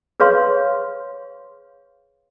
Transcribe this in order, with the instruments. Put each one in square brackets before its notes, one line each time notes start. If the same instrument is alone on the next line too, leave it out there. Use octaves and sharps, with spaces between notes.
[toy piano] G#4 B4 C#5 F5 C6